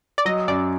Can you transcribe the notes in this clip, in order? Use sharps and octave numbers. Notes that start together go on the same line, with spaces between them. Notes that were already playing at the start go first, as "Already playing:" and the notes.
D5
F#3 D#5
F#2 D5